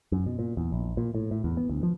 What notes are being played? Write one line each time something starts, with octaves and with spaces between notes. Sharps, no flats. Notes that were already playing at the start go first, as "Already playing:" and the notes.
F#2
B2
A#2
E2
A#1
A#2
A2
A2
E2
B3
D2
F3